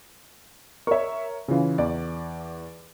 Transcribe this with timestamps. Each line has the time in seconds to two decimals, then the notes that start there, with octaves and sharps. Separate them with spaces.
0.87 A#4 C#5 E5 C#6
1.48 C#3 E3 C#4 F4
1.78 E2 D5